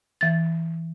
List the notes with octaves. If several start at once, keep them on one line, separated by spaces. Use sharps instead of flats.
E3 A6